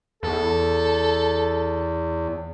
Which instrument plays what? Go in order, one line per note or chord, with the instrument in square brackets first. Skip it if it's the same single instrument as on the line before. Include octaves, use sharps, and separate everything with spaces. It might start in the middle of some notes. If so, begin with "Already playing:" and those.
[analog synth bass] E2 [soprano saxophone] A4